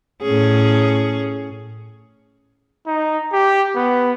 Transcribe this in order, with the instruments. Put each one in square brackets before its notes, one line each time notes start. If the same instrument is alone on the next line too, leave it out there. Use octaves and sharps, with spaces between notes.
[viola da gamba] A2 C#4 G#4
[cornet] D#4
G4
B3